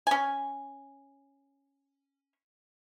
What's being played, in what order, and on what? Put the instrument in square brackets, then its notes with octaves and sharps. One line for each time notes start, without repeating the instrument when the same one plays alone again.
[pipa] C#4 G#5